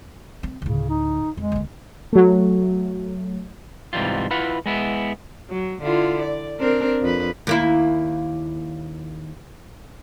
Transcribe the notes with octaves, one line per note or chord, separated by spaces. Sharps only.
C4
D2 A2 C#3
D#4
F2 G#3
D2 A#3
F#3 A3
G#2 C3 E3 G3 F4
E4 F4 B4 F#5
G#3 B3 E4
F#3
D3 E4 F4
D5
C4 D4 A#4
F2 B4
D#2 A#3 E4